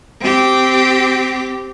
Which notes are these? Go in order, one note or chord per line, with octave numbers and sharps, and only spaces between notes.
C4 G4